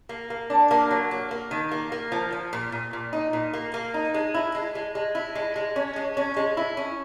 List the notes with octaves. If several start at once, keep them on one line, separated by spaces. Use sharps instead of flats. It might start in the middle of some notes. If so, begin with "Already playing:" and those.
A#3
A#3
D4
A#3
F#3
A#3
A#3
D#3
A#3
A#3
F3
F3
A#2
A#2
A#2
D#4
A#2
A#3
A#3
D#4
G#3
E4
G#3
G#3
G#3
E4
G#3
G#3
C#4
G#3
C#4
G#3
E4
C#4